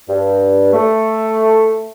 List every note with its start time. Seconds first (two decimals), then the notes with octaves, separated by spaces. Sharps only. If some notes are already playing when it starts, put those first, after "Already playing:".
0.09 G2
0.73 A3